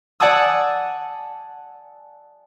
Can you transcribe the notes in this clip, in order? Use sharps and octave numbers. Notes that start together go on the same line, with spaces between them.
D5 F#5 G#5 A5 D#6 E6